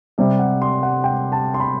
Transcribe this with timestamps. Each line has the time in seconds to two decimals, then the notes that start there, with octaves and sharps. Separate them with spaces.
0.18 C3 G3 C4 E5
0.39 F#5
0.62 C6
0.83 F#5
1.04 G5
1.32 A5
1.54 C6
1.60 B5